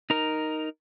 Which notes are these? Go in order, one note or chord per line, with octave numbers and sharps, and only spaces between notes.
D#4 A#4